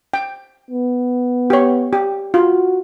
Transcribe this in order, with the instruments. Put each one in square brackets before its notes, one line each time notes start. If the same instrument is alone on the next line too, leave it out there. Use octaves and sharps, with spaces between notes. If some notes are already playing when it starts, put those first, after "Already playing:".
[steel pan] G5
[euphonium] B3
[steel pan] G4 C#5
G4
[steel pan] F4 [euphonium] F#4